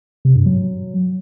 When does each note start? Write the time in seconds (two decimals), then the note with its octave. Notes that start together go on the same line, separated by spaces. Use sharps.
0.25 C3
0.35 G2
0.46 F#3